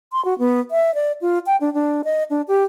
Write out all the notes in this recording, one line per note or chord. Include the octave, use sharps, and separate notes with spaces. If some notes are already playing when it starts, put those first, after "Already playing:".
C6
F#4
B3
E5
D5
F4
G5
D4
D4
D#5
D4
G4